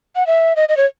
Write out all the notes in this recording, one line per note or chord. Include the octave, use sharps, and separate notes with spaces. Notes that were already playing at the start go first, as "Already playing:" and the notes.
F#5
E5
D#5
D#5
C#5